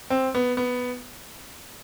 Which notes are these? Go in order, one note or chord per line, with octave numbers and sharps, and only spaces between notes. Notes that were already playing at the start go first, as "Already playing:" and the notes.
C4
B3
B3